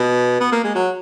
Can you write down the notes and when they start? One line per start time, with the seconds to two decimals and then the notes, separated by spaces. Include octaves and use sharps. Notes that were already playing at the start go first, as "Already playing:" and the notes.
Already playing: B2
0.41 B3
0.52 A#3
0.64 G#3
0.75 F#3